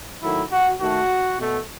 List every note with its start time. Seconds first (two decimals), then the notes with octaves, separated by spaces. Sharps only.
0.23 D#3 F#3 A3 E4
0.52 F#4
0.80 D#3 A3 F#4
1.38 B2 A3